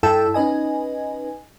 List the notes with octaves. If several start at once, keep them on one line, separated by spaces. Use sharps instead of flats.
G2 E4 A4 G5 A5 E6
C#4 D#4 B4 D#5 G#5